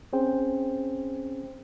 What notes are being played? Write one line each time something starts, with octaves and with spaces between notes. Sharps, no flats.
C4 C#4 G#4 C5 G5